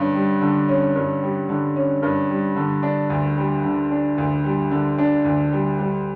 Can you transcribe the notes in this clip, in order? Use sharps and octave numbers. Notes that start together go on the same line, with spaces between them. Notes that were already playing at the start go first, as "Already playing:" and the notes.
Already playing: G2 D3 C#4
G3
D3
C#4
G2
G3
D3
C#4
G2
G3
D3
D4
D2
G3
D3
D4
D2
G3
D3
D4
D2
G3
G3